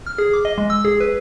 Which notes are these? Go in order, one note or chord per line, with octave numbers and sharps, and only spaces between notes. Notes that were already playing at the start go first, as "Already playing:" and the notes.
F6
G#4
D6
D#5
G#3
E6
G#4
B4